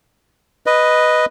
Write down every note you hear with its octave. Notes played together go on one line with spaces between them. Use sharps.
B4 D#5